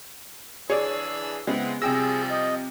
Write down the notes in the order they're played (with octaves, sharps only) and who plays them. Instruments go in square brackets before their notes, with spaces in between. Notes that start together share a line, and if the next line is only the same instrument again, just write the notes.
[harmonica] E3 D4 E6 [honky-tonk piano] G#4 [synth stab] C#5 D5
[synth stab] C#3 [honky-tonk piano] G#3 B3 [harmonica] C4 E4 F#5
[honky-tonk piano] C3 G5 A#6 [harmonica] F3 G3 [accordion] G#4 [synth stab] E6
[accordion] D#5